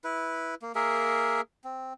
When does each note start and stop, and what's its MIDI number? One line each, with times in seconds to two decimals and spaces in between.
0.04 0.55 64
0.04 0.55 71
0.62 0.72 58
0.75 1.41 58
0.75 1.41 68
0.75 1.41 70
0.75 1.41 76
1.64 1.93 60